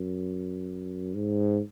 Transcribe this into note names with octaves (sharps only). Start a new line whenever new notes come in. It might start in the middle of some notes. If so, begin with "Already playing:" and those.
Already playing: F#2
G#2